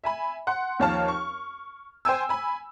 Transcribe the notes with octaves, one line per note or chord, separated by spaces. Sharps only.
E5 G#5 B5
F#5 C6
D#2 F3 C#5 F5 A5 F6
C#6
C5 G5 G#5 E6
G#5 B5